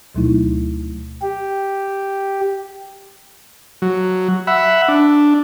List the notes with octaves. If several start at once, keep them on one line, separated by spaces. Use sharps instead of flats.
D2 B2 F#3 A3 D#4 E4
G4
F#3
E5 F#5 B5
D4